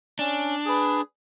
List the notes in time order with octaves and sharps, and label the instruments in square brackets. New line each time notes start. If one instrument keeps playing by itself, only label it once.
[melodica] C#4 [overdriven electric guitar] D4
[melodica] G#4 B4